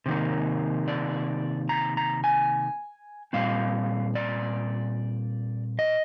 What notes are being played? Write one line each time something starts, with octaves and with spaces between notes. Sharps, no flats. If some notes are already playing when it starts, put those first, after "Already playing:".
C3 D#3 A#3
D5
A#5
A#5
G#5
A#2 G3 C4 F5
D5
D#5